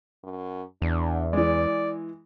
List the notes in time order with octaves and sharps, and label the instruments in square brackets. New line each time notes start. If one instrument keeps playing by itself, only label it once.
[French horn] F#2
[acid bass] E2 [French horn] D4
[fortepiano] E3 G#3 [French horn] D5